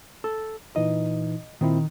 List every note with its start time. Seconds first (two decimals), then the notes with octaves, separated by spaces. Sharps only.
0.24 A4
0.76 A#2 E3 D#4 D#5
1.61 A#2 D#3 C4 E4